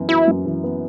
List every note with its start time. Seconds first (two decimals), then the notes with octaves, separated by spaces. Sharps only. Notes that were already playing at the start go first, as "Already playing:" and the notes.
Already playing: F#2 E3 B3
0.09 E4 F#4
0.27 F#2
0.46 E3
0.64 B3